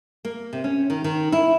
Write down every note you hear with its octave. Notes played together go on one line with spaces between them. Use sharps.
A#3
C3
C#4
D#3
D#3
E4